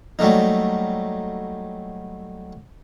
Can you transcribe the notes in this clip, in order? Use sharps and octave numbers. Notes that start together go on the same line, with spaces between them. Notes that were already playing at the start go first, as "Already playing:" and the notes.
F#3 G3 A3 A#3 D#4